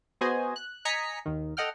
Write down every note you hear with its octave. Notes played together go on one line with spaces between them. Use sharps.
B3 F#4 G#4 C5 D#5 G#5
F#6
D#5 G#5 A#5 B6 C#7
D#2 D#3
A4 D#5 F#5 G5 F6